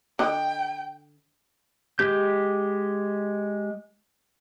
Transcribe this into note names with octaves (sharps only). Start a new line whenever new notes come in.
D3 D#5 G5
G#3 G4 G6